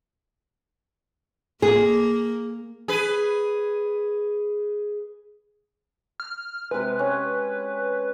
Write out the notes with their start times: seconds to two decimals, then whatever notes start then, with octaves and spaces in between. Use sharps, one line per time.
1.62 A#3 G#4
2.88 G#4 B4
6.20 F6
6.71 C3 G#3 B4
6.99 C#4